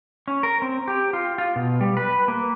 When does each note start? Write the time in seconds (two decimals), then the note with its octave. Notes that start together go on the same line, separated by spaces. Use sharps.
0.28 C#4
0.43 A#4
0.62 C4
0.88 G4
1.13 F4
1.38 F4
1.56 B2
1.81 G3
1.97 B4
2.28 A#3